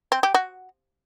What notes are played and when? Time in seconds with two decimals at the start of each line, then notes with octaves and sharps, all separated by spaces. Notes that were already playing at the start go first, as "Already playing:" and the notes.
0.12 C4
0.23 G4
0.34 F#4